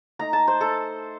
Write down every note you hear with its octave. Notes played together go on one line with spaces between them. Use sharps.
A3 D#4 A#5
A5
C5
A4